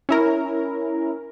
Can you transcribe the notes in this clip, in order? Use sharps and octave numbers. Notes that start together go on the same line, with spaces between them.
C#4 E4 A#4